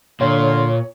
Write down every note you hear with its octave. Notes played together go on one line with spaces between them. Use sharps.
A#2 D3 C#5 F5 C6